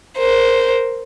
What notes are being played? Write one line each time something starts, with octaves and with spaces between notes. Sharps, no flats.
A#4 C5